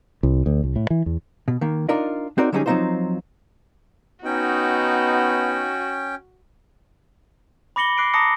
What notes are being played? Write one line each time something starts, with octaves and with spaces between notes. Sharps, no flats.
C2
D2
C2
A2
E3
E2
B2
D#3 A#3
D4 D#4 F4 A#4 D5 D#5
C4 D#4 F#4 A#4 C#5 D5
D3 F#3 G3 C#4 D#4 G#4
F3 F#3 C4 D#4 F4 C5
B3 C#4 D#4 F#4 G5
B5 D6 A#6 C#7 F#7 G7
D6 F#6 C7 D7
A5 A#5 D6 D#6 A#6 C#7